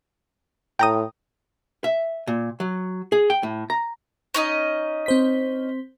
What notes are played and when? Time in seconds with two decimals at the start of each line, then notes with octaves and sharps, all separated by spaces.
0.79 A2 G5 A#5 D#6
1.84 E5
2.27 A#2
2.60 F#3
3.12 G#4
3.30 G5
3.43 A2
3.70 A#5
4.34 C#4 D#4 D#5
5.06 C4 C5 B6